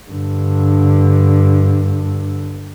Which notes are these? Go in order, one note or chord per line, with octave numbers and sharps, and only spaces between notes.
G2 D3